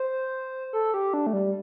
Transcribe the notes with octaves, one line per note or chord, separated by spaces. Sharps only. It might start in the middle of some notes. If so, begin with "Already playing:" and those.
Already playing: C5
A4
G4
D4
A3
G3